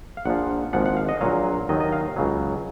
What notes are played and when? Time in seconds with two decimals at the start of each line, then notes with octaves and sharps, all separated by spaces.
0.17 F5
0.25 A#1 A#2 F3 F#5
0.73 G#1 G#2 F3 F#5
0.86 F#5
0.97 F5
1.09 D#5
1.21 A#1 A#2 F#3 F5
1.69 D#2 D#3 F#3 D#5
1.80 D#5
1.92 F5
2.16 C#2 C#3 F#3